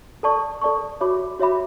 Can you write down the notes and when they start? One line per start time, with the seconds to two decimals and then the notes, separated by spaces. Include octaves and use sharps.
0.23 A4 D5 A5 C#6
0.61 A4 D5 A5 C#6
1.01 F#4 C#5 E5 B5 D6
1.39 F#4 C#5 E5 B5 D6